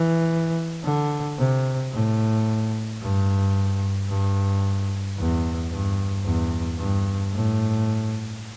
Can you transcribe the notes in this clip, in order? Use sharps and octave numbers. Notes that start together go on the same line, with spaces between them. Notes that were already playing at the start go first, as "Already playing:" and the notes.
Already playing: E3
D3
C3
A2
G2
G2
E2
G2
E2
G2
A2